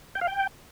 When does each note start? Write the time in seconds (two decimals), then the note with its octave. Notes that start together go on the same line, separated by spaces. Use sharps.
0.15 G5
0.21 F5
0.27 G5